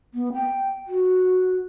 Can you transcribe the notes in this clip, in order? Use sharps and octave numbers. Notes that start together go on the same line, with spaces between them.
B3
G5
F#4